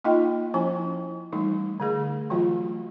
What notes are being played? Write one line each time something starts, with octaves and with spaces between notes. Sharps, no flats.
A#3 D#4 F4 D#5 G5
F3 C#4 E4 G#5
E3 G3 A3 D#4
D3 A3 G#4
E3 F#3 A3 F4 F#4